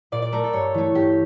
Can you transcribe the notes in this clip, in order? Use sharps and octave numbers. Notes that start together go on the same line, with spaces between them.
A#2 D5
D5
A3 A#4
A4
G2 C#5
E3 A3
G2 G4